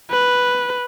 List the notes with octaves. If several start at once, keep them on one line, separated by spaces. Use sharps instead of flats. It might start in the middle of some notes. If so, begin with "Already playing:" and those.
B4